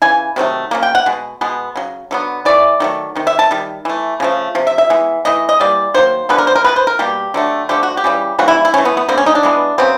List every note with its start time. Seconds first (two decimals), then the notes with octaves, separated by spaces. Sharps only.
0.02 C#3 E3 G#5
0.36 C3 D#3 F#3 A3
0.71 C#3 F#3 A#3
0.83 G5
0.95 F#5
1.06 B2 G#3
1.41 B2 G#3 B3
1.76 C#3 F#3
2.11 D3 F#3 B3
2.45 E3 A3 D5
2.80 D#3 F#3 A3
3.15 C3 D#3
3.27 E5
3.39 A5
3.51 D#3 G3
3.85 E3 A3
4.20 C#3 F3 A3
4.55 C3 F3
4.67 E5
4.78 E5
4.90 E3 G#3 B3
5.25 E3 A3 D#5
5.49 D#5
5.60 E3 G3 A#3 D5
5.94 D#3 F#3 A#3 C5
6.29 D3 F3 G#3 B3 B4
6.38 A#4
6.47 C5
6.56 A#4
6.64 G#3 B3 B4
6.69 B2
6.76 C5
6.87 A#4
6.99 B2 G3 A#3 G4
7.34 D3 F#3 A3
7.69 D3 F3 A3 G4
7.83 F#4
7.97 G4
8.04 C#3 E3 G3
8.38 C#3 E3 G3 A#3 F#4
8.48 E4
8.65 E4
8.74 E3 A3 C#4
8.85 B3
8.97 B3
9.08 D3 G3 A#3 C4
9.18 C#4
9.26 D#4
9.35 D4
9.43 E3 G#3 B3
9.78 C#3 F#3 B3 C4